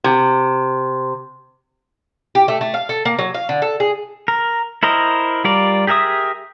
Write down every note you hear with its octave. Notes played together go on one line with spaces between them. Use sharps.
C3
G4
A3
A3
F5
A4
A#3
F#3
F5
D3
A4
G#4
A#4
E4 A#4 C5 D#5
G3 F4 A#4 D5
G4 G#4 A#4 E5 D#6